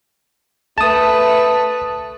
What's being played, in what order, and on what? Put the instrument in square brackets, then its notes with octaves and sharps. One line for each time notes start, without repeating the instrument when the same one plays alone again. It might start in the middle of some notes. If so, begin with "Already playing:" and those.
[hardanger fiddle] A3 B4 [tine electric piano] A5 D#6